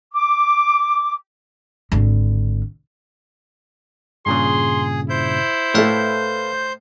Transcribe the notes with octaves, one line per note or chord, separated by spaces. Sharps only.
D6
G#1 D3
G2 A#2 C#3 G#4 C6
E4 C5 G6
A2 A3 A4 B4 F5